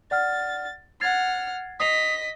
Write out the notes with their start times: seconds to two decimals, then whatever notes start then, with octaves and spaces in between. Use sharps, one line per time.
0.11 D5 F#5 F6 A6
1.01 F#5 F6 G#6 A6 C7
1.80 D#5 D#6 B6 C7 F7